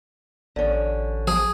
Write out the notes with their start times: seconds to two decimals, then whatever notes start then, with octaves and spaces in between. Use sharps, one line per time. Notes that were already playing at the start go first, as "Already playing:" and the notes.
0.56 A1 D3 C#4
1.27 F3 G#4